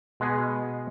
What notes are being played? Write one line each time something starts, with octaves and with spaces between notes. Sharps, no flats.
B2 G#3 B3 G#4